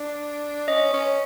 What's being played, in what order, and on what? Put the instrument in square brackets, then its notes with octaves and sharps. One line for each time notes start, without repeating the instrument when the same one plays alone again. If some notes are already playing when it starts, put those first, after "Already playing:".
Already playing: [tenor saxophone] D4
[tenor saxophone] C#4 [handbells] D#5
[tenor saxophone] C#4